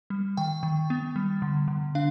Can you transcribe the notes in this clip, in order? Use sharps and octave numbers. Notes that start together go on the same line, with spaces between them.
G3
D#3 G5
D#3
B3
G3
D3
D3
D4 F5